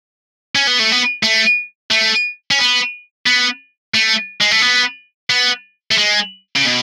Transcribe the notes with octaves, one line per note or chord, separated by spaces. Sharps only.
C#4
B3
A3
B3
A3
A3
C#4
B3
B3
A3
G#3
A3
B3
B3
A3
G#3
C#3
B2